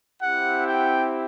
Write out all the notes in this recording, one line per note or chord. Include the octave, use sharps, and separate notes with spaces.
C4 E4 G4 F#5
G5